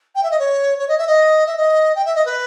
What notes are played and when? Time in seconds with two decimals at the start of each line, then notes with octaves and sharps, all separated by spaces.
0.15 G5
0.23 E5
0.31 D#5
0.39 C#5
0.78 C#5
0.89 D#5
0.98 E5
1.07 D#5
1.46 E5
1.57 D#5
1.96 G5
2.06 E5
2.15 D#5
2.25 B4